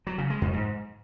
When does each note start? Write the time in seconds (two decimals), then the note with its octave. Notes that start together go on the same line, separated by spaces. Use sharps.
0.07 F#3
0.18 C#3
0.30 G#3
0.42 F2
0.53 G#2